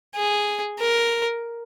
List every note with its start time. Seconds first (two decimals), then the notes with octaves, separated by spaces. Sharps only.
0.15 G#4
0.79 A#4